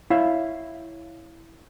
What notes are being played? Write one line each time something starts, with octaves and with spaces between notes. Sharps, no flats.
E4 C#5 E5 F5